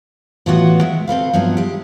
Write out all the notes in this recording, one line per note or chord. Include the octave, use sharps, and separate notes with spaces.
A2 E3 B3 F4 F#4 F#5
G#3 E5
C4 A4 B4 F5
G2 F3 F#3 B3 C4 E4
G#3 G4